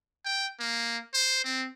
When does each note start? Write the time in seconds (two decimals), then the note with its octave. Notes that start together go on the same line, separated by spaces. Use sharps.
0.25 G5
0.60 A#3
1.14 C5
1.44 C4